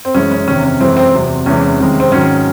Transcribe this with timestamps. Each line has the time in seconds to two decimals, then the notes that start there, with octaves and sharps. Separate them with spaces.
0.05 C4
0.14 F#2 E3 G#3 C#4
0.32 C#4
0.47 E2 C3 D#3 C#4
0.64 C#4
0.81 F#2 E3 G#3 C4
0.97 C4
1.13 E2 C3 F#3
1.46 E2 C3 E3 G#3 C#4
1.79 C3 D#3 G#3
2.00 C4
2.11 G#2 D#3 F#3 C#4